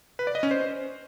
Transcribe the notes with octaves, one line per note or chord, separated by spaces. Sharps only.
B4
D5
D#5
C#4
C5